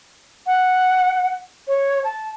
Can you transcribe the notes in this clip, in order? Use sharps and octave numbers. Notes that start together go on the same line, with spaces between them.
F#5
C#5
A5